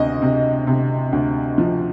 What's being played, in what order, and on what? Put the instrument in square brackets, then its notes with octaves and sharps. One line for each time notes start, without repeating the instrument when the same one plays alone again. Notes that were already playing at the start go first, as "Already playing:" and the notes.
Already playing: [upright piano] D2 C3 D#5
C3
C3
D2
F3